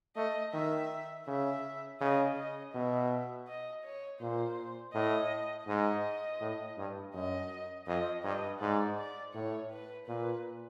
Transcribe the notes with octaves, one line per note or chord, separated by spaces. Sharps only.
A3 D#5
D#3 E5
C#3 E5
C#3 D#5
D#5
B2 E5
D#5
C#5
A#2 C5
A2 D#5
G#2 D#5
A2
G2
F#2 D#5
F2 D#5
G2 D#5
G#2 D5
D5
A2 C#5
B4
A#2 B4